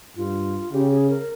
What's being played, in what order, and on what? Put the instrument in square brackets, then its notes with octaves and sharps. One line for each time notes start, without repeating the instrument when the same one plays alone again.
[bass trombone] G2 [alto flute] F4
[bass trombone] C#3 [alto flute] G4
[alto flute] G#4
A#4